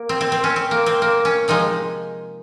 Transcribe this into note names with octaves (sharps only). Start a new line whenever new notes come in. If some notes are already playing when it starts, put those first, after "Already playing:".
Already playing: A#3
C4
C4
C4
C#4
C4
A#3
C4
A#3
C#4
C3 F3 G#3 D#4